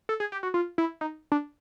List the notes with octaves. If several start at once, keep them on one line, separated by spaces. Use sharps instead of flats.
A4
G#4
G4
F#4
F4
E4
D#4
D4